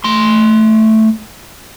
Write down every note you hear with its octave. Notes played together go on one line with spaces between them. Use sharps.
A3 C6